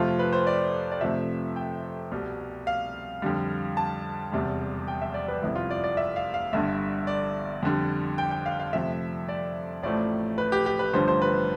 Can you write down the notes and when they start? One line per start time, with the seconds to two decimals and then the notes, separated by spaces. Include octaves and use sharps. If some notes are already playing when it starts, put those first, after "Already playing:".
Already playing: F2 C3 F3 A3 F4
0.19 B4
0.33 C5
0.47 D5
0.91 D5
1.01 F2 C3 F3 A3 E5
1.56 G5
2.12 C2 B2 G3
2.67 F5
3.22 F2 D3 G3
3.77 A5
4.32 E1 E2 C3 G3
4.88 G5
5.02 E5
5.14 D5
5.28 B4
5.42 G1 F2 C3 E4
5.56 F4
5.70 D5
5.84 D5
5.97 E5
6.16 F5
6.34 F5
6.53 G1 G2 D3 E5
7.07 D5
7.63 F2 D3 G3
8.18 G5
8.31 G5
8.46 F5
8.59 F5
8.73 F2 C3 F3 A3 E5
9.29 D5
9.83 A1 A2 F3 A3 D5
10.38 B4
10.52 G4
10.66 G4
10.79 B4
10.93 A1 G2 D3 F3 C5
11.08 C5
11.22 B4